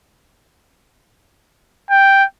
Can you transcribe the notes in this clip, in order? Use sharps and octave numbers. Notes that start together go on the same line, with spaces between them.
G5